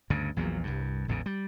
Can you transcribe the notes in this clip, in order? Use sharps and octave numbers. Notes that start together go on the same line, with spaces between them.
D2 G2 C#3
A#1 E2 A#2 F#3
C2 G2
A1 E2 G#2 C#3
G3